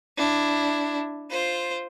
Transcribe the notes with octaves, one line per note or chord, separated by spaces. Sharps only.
D4 E4
F4 C5